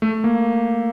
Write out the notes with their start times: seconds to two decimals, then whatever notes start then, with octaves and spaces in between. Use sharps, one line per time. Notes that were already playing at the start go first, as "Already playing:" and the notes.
0.02 A3
0.24 A#3